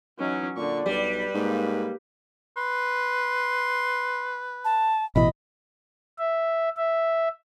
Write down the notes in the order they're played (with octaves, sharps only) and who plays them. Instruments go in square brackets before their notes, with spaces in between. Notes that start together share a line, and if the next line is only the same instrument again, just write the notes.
[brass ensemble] E3 D#4 [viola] F#3 C#4
[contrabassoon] A#2 [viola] D3 C#6 [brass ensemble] D5
[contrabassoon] B1 [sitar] G3 [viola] B4
[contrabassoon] G#2 [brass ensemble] A#3
[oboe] B4 [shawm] C6
[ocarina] A5
[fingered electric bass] A1 B2 E3 [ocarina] D#5 [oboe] B5
[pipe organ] E5
E5